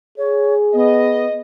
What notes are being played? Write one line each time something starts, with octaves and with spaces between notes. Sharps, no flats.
G#4 C#5
B3 D#5